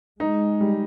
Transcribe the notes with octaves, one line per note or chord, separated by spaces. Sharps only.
G#3 D#4
G3